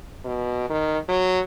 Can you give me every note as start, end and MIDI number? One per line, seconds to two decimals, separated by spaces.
0.25 0.66 47
0.69 0.98 51
1.09 1.39 54